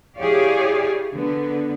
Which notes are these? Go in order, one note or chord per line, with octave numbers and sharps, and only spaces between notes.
E4 G4 G#4 C#5 D5 F5
D3 B3